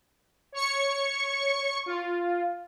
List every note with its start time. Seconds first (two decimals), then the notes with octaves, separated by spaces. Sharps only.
0.52 C#5 C#6 C#7
1.86 F4